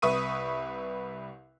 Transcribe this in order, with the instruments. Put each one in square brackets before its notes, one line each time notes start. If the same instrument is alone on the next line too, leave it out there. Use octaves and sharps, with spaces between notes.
[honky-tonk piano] C2 B4 E5 C#6 D#6 D#7